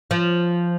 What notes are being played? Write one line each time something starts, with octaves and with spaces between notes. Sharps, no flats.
F3